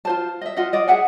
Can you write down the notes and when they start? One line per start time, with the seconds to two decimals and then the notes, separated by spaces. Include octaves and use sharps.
0.05 F4 C5 A5
0.41 D#5 E5
0.57 F4 D#5 E5 F#5
0.73 F4 D5 D#5
0.88 G#4 E5 F#5 G#5